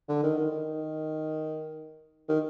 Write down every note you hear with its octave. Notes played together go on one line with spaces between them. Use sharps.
D3
D#3
D#3
D#3
D#3